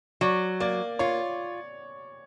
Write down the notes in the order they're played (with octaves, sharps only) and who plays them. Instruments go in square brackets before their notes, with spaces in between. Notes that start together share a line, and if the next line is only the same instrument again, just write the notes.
[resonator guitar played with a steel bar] F#3 [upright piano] D5
[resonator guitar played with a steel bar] A#3 [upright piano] D5
[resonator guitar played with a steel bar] F4 [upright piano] C#5